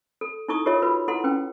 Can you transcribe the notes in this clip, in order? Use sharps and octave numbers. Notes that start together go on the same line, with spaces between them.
A4
D#4 E4 A4 C#6 D#6
F4 G4 A4 A#4 C#5 E5
F4 F#4 B4 B5
E4 A4 F#5 C6
C#4 B4 G5